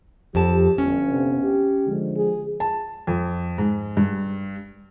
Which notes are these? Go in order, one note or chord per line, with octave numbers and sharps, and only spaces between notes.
F2 F3 G4 A5
G1 C#4
C3
G4
D3 F3 G#3
G#4
A5
F2
G#2
G2